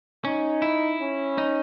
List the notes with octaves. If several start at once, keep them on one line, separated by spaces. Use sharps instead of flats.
C#4 D#4
E4
C#4
D#4